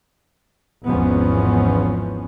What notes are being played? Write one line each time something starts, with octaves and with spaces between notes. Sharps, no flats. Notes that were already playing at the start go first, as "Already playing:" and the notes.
G#1 E2 G#2 F3 B3 C#4